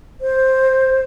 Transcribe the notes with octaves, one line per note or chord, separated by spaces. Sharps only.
C5